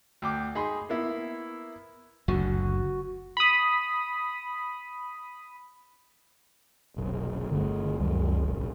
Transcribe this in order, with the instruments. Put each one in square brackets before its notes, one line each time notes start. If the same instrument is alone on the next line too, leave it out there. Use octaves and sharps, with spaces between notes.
[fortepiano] D2 G5 D6
D#4 G#4 B5 C6
A#3 B3 E4
[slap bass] F#1 D2 D3 [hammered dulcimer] F#4
[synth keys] B5 D#6
[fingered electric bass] F1 B1
[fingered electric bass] G1 G2 A3 [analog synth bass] D3
[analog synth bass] C#2 [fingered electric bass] F#2 D#3 G3
[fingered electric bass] F1 A#1